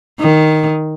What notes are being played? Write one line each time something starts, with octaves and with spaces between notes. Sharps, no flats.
D#3